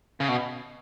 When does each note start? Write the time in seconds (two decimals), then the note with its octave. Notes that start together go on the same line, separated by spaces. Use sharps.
0.20 C#3
0.28 B2